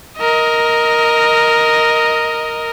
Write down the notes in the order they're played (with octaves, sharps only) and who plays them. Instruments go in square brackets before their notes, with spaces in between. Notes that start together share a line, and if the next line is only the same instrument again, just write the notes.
[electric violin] A#4 D#5